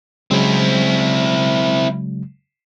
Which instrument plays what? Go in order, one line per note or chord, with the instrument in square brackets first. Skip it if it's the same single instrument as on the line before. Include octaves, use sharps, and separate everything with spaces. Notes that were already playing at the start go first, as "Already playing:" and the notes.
[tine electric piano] C#3 F#3 G#3 [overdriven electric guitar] C4 E4